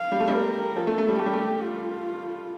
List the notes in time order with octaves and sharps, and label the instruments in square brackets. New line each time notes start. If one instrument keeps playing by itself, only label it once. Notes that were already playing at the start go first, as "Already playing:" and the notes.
Already playing: [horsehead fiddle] F5
[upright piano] G3
A3
G3
[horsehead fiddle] A#4
[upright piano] F3 [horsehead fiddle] A4
[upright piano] A3
A3
G3
[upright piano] A3 [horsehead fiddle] G4
[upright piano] G3
A3
[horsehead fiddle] F4